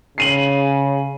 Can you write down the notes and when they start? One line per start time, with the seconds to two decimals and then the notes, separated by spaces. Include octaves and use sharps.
0.18 C#3 C7 D#7 F#7